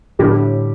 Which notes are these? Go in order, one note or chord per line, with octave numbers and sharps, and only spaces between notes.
A2 D3 G3 D4 G4